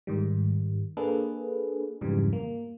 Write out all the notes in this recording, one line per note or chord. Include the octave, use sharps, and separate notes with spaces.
G#2 D#3 G3
A#3 D4 G#4 A4 B4
F2 G#2 C#3 E3 G3
A#3